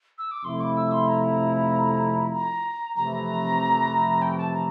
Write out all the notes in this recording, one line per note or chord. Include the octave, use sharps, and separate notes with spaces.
E6
D6
F2 C3 F3 A3 E4 C6
D6
E6
C6
A#5
A#5
F2 C3 E3 A3 A#5
G5
A5
A#5